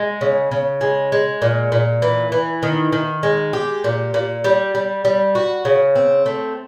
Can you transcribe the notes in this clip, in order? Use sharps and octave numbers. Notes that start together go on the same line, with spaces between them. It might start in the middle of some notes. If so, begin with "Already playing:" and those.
Already playing: G#3
C#3
C#3
G#3
G#3
A#2
A#2
E3
E3
D#3
D#3
G#3
G4
A#2
A#2
G3
G3
G3
F#4
C#3
C4
A3